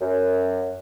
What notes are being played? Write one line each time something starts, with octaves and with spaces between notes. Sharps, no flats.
F#2